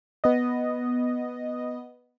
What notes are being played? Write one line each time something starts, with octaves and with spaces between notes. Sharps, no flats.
B3 D#5